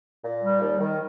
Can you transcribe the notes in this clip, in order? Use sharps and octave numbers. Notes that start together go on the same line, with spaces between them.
A#2
G3
D#2
D#3